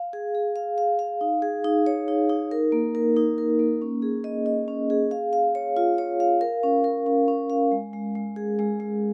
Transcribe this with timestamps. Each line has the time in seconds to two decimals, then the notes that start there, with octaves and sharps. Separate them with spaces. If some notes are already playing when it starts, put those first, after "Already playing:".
Already playing: F5
0.13 G#4
0.35 G#4
0.56 F5
0.78 F5
0.99 F5
1.21 D#4
1.42 G#4
1.64 D#4
1.86 C#5
2.08 D#4
2.29 D#4
2.51 A#4
2.72 A#3
2.95 A#4
3.16 D#4
3.38 A#4
3.59 A#3
3.82 C#4
4.02 G#4
4.24 D#5
4.46 D#5
4.68 C#4
4.90 G#4
5.11 F5
5.33 F5
5.55 C#5
5.77 F4
5.98 C#5
6.20 F5
6.41 A#4
6.63 C#4
6.84 A#4
7.06 C#4
7.28 C#4
7.50 F5
7.72 G#3
7.93 G#3
8.15 G#3
8.36 G#4
8.59 G#3
8.80 G#3